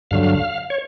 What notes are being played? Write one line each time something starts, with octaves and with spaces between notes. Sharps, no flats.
G2 D3 F#3 F5
C#5